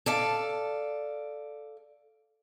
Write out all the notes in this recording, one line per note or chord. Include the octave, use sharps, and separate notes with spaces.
A4 D5 F5